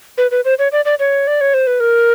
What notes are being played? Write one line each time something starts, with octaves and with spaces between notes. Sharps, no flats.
B4
B4
C5
C#5
D5
D5
C#5
D5
C#5
C5
B4
A#4